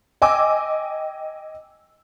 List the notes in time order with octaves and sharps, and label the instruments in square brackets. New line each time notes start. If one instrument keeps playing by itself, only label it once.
[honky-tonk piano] D#5 G5 G#5 D6 E6